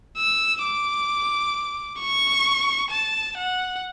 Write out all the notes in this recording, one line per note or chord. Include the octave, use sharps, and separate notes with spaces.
E6
D6
C#6
A5
F#5